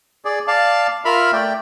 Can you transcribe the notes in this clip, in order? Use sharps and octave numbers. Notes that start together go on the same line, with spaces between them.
G#4 D5
D5 F5 A5
F4 A#4 E5 B5 F6
A3 D5 G5